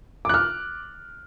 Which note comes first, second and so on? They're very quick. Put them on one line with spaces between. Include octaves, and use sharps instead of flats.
D6 F#6 F6